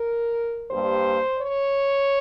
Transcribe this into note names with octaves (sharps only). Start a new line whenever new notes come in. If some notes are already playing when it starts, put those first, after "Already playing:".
Already playing: A#4
G2 G3 A#3 C5
C#5